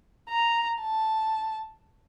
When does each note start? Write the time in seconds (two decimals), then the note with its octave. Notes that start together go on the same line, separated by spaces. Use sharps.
0.29 A#5
0.81 A5